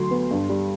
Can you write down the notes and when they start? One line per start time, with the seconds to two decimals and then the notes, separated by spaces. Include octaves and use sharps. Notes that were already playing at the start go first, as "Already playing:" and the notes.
Already playing: D2 F#3 C6
0.11 B3
0.31 G2
0.49 G3